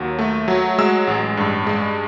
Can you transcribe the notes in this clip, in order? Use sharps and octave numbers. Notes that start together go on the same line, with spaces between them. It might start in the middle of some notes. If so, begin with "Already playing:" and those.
Already playing: D#2 F#3
A3
F#3
G#3 E6
A1
G2
G#3